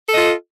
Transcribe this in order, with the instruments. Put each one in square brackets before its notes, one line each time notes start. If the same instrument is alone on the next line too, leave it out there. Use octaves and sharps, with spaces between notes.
[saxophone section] A4
D#5
F4